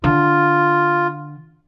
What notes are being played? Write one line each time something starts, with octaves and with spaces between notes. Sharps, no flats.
D3 F4